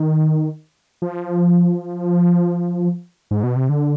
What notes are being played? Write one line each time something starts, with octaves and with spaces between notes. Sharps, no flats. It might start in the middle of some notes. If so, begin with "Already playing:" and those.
Already playing: D#3
F3
G#2
B2
C3
D3